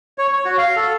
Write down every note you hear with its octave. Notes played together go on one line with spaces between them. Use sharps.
C#5
C#5
F#4
F5
A4